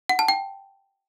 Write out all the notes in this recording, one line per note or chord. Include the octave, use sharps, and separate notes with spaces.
F#5
A5
G5